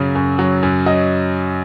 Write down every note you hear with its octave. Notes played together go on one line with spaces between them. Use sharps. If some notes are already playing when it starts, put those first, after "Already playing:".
Already playing: F#2 C#3 F#3
F#2
F#3
F#2
F#3 D#5